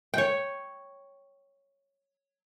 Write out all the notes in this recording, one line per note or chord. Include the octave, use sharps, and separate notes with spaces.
C#5 G5